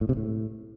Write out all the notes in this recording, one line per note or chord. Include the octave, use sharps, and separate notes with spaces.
A2
C3
A2